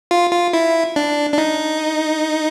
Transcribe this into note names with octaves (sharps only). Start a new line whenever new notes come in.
F4
F4
E4
D4
D4
D#4